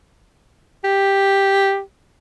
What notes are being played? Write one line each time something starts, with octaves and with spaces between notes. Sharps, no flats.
G4